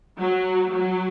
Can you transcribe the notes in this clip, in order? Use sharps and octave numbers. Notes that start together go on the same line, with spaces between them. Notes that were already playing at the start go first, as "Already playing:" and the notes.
F#3
F#3